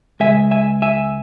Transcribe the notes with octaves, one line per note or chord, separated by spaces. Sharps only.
C#2 C#3 G#3 E5 G#5
E5 G#5
E5 G#5